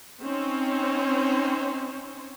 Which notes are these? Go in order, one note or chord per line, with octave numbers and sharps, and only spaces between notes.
C4 C#4 D#4 C5 C#5